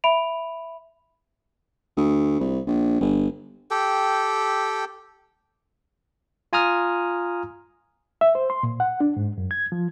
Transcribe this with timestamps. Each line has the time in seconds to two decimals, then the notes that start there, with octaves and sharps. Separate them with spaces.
0.04 E5 B5 D7 F7
1.97 D2
2.40 C2
2.66 A#1
3.00 G1
3.71 G4 A4 G5
6.53 F4 G#5 A#5 D#6 F6
8.21 E5
8.35 C5
8.50 C6
8.63 A#2
8.80 F#5
9.00 D4
9.17 G#2
9.38 F#2
9.51 G#6
9.72 F3